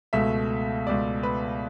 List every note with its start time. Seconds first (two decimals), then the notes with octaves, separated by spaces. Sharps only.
0.13 C#2 B2 A3 E5
0.87 C#2 B2 A3 D5
1.23 B4